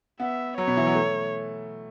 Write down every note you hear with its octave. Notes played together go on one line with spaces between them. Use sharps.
B3 E5
F#3 C#5
B2
E3
F#3
A3